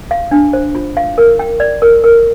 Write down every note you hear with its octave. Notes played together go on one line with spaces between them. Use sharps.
F5
D4
C5
F4
F5
A#4
G5
D5
A#4
A#4